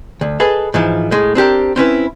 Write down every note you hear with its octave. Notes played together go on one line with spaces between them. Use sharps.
D2
G#4 A4 B4 D#5
G#2 E3 F3
A2 G#3
C4 D4 G4 A#4
C4 C#4 E4 B4